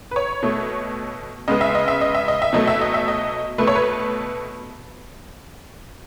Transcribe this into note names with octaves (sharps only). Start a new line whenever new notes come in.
B4
C#5
B2 A3
C#3 G#3 B3 D#5
E5
D#5
E5
D#5
E5
D#5
E5
B2 F#3 A3 D#5
E5
D#5
E5
D#5
B2 A3 B4
C#5
B4